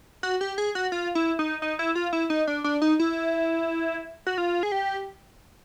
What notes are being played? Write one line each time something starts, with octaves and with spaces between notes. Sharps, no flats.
F#4
G4
G#4
F#4
F4
E4
D#4
D#4
E4
F4
E4
D#4
D4
D4
D#4
E4
F#4
F4
G#4
G4